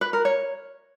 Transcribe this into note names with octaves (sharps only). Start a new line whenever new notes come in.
B4
A#4
C#5